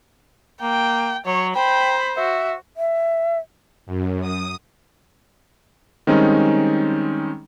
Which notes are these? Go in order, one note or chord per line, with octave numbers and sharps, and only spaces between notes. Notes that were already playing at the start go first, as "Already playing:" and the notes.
A#3 G5
F#3 C#5
C5 G5 B5
F#4 E5
E5
F#2
D#6
D#3 G3 G#3 C4 C#4 D#4